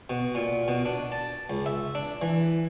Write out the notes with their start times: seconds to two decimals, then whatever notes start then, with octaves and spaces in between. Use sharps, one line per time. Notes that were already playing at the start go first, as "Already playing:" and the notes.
0.10 B2
0.35 A#2
0.68 B2
0.85 D4
1.12 A5
1.50 C#2
1.66 E5
1.95 D4
2.22 E3